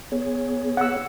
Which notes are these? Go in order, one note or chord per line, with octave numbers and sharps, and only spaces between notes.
B3 G#4 C#5
F#5 E6